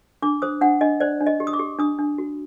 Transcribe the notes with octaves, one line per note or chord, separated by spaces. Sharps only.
D4 D6
C5 D#6
D4 F#5
D4 D#5
C5 D5
D4
D#5
G4
D#6
D6
G4
D4 D#6
D4
F#4